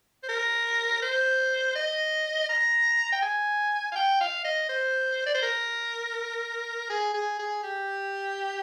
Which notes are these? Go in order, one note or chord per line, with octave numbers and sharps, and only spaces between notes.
C5
A#4
C5
D#5
A#5
G5
G#5
F5
G5
F5
D#5
C5
D5
C5
A#4
G#4
G#4
G#4
G4